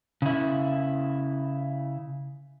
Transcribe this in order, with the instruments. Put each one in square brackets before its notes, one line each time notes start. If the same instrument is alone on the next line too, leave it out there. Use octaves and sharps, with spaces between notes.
[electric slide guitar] C#3 E4